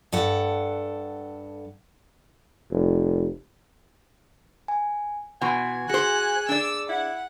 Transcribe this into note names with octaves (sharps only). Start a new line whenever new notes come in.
G2 A4 F#5 G5
F1
G#5
B2 E3 F#5 G#5 C6 C#6
F#4 G#4 C5 F#6 C#7
D4 D5 E6
E4 F#5